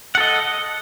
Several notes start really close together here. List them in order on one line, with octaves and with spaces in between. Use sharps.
F#5 A4 D#5